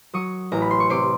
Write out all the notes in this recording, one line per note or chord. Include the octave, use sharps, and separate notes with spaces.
F#3 C#6 D#6
A1 A#5
B5
C6
C#6
C3 C6 D6